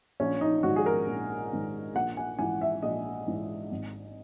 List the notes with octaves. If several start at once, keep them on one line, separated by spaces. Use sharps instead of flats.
A#1 C#4
D#4
G#2 D#3 F#4
G#4
A#4
A#1
G#2 D#3
A#1 F#5
G#5
G#2 E3 G#5
E5
A#1 D#5
G#2 E3
G#1